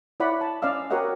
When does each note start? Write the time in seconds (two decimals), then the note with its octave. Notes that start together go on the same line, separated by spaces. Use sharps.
0.20 E4 C#5 D5 F#5 B5
0.41 A5
0.62 C#4 D5 D#5 F5 E6
0.90 F#4 G4 A#4 C#5 D#5 F#5